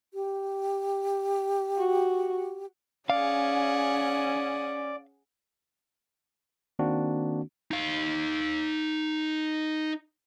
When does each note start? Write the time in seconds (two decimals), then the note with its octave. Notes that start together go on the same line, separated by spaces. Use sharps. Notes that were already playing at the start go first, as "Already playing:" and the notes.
0.14 G4
1.77 F#4
3.10 C#4 G#4 D5 F5 F#5
6.79 D#3 A#3 C4 D4 F#4
7.71 D#4 F5